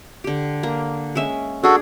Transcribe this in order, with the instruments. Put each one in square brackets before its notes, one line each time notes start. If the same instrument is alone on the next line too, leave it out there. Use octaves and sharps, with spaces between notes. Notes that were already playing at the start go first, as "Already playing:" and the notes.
[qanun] D3 G4
A#3 A#5
G#3 C#4 E5
[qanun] D4 G#4 [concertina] F#4 A4